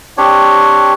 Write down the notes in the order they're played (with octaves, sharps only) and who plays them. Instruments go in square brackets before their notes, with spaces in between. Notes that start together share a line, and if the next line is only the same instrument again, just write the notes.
[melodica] C4 D4 G4 C#5